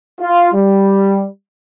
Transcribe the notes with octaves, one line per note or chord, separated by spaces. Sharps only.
F4
G3